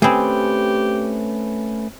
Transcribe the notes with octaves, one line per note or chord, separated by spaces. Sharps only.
A3 C4 C#4 G4 G#4 B4